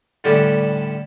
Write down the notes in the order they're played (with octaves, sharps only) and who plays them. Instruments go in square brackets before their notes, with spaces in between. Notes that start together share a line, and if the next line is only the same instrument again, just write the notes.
[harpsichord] A2 D3 G3 C#4 D4 A4